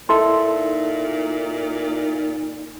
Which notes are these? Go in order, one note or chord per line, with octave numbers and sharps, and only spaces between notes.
A#2 D#4 E4 A4 E5 C6